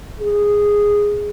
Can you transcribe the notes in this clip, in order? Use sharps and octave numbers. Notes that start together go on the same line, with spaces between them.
G#4